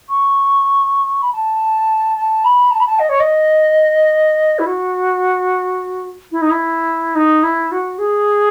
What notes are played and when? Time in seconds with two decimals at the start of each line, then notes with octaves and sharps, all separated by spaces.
0.08 C#6
1.22 B5
1.32 A5
2.17 A5
2.44 B5
2.71 A5
2.80 B5
2.87 A5
2.99 D#5
3.09 C#5
3.20 D#5
4.59 E4
4.66 F#4
6.32 E4
6.41 D#4
6.50 E4
7.15 D#4
7.43 E4
7.71 F#4
7.98 G#4